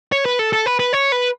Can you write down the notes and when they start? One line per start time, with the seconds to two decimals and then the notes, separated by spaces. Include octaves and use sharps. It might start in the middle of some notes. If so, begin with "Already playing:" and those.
0.12 C#5
0.26 B4
0.39 A4
0.53 A4
0.66 B4
0.79 B4
0.93 C#5
1.12 B4